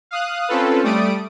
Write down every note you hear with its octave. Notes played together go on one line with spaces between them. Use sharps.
F5 D#6 F#6
C4 C#4 F4 A4 B4
G3 A3 D5 D#6 D7